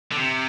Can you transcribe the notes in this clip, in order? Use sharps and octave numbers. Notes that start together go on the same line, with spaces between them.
D3
C3